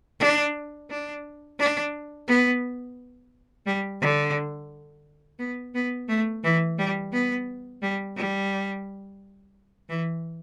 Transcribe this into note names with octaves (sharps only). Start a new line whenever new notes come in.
D4
D4
D4
B3
G3
D3
B3
B3
A3
E3
G3
B3
G3
G3
E3